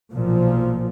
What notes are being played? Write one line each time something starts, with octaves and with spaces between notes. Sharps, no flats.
B1 A#2 F3